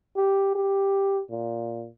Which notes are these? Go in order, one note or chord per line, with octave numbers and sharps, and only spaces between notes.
G4
G4
A#2